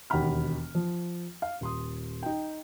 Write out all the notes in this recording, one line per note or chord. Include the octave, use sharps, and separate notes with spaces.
E1 D#2 F#5 G5 B5 F6
F3
F5
D#1 C6 D#6
D#4 G5